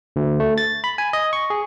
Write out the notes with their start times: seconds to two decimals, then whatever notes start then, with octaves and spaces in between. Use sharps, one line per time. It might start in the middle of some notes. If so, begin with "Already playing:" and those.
0.16 D2
0.40 A3
0.58 A6
0.84 B5
0.98 G#5
1.13 D#5
1.33 C#6
1.50 G#4